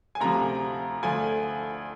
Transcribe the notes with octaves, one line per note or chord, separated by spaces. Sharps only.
G#5
D2 C3 F3 A#5
D2 D3 F3 G#5